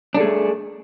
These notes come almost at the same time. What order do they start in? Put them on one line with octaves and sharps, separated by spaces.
D4 A4 G#4 A3